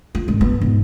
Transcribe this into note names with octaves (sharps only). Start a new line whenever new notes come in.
F4
G#1
B3
G#2